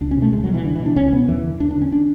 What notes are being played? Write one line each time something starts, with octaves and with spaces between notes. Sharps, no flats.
C#2 D4
C#4
B2
A3
C#2 G#3
F#3
B2
E3
C#2 D3
E3
B2
D4
C#2 C#4
B2 B3
E2 E3
D3
E2 D4
D4
D3
C#4
D4